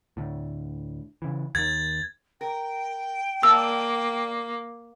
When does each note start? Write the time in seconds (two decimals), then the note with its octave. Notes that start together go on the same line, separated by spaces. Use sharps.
0.17 D2 A2
1.22 C#3 E3
1.55 D#2 D#3 G#6 A6
2.41 A#4 G5
3.43 A#3 D5 F5 A5 E6